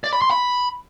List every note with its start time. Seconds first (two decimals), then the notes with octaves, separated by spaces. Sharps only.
0.04 D5
0.13 B5
0.22 C6
0.31 B5